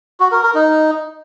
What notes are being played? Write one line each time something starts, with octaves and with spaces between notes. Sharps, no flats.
F#4
A#4
A#4
D#4